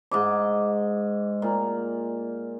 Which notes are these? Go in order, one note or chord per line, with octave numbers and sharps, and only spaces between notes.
G#2 D#5 D6
A#2